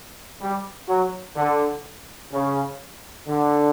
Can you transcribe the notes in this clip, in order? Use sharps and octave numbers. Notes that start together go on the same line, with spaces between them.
G3
F#3
D3
C#3
D3